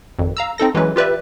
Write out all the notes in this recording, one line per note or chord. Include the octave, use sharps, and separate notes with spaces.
G#1 F2
F5 A#5 E6
C4 D#4 A4 A#6
E3 F#3 G#3 C#4 B4
F4 G4 B4 D5 E5